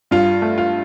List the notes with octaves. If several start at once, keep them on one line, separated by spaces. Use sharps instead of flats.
G2 F4
A3
F4